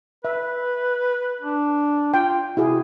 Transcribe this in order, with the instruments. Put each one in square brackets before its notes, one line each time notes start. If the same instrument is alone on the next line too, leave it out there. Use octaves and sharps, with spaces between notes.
[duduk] B4 [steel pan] E5
[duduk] D4
[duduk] F4 [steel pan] G5
[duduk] C3 [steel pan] E4 F#4 G#4